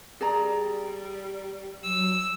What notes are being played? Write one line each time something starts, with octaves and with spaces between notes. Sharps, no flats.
G3 G#4 D5 A#5
F#3 E6